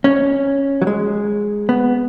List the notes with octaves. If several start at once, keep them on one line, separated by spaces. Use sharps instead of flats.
C#4
F#3
G#3
B3